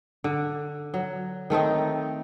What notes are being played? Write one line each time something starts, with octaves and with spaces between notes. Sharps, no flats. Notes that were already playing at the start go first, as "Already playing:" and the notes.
D3
F#3
D#3 A3 C4 D#4